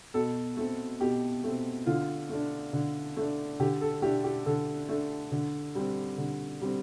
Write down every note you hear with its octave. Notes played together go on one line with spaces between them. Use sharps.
B2 A4
A3 C4
B2 G4
A3 C4
D3 F4
A3 D4
D3
A3 D4
D3 G4
A4
A3 D4 G4
G4
D3 A4
A3 D4
D3
G3 C4
D3
G3 C4